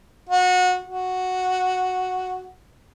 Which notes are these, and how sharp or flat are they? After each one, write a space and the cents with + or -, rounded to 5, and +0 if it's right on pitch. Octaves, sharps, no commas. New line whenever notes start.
F#4 -25
F#4 -5